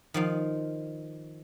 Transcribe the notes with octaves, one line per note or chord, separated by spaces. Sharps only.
D#3 F3 F5